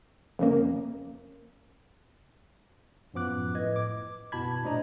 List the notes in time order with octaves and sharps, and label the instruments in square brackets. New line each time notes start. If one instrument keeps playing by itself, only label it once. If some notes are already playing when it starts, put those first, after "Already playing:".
[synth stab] F2 C#3 A#3
[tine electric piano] F#2 A2 F3 B3 D6 F#6
A2 B4 D#5 G#6
D6
F#2 B2 E4 A5 B5 G#6
A#2 A3 D4 C5 D#5 A#5